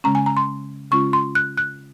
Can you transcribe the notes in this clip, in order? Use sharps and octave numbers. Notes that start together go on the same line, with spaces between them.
C#3 G#3 C#4 A#5
G#5
A#5
C6
C#3 G#3 C#4 F4 C#6
C6
F#6
F#6